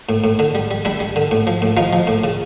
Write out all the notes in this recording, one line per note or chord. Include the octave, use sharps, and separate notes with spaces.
A2
A2
D3
G3
G3
G3 D4 E4
G3
D3
A2
F3
A2
F3 D#4 F4
F3
A2
C#3